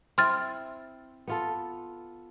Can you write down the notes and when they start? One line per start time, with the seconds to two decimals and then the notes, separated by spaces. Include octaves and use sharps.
0.18 C4 E4 C6 F6 A6
1.28 B3 F4 A4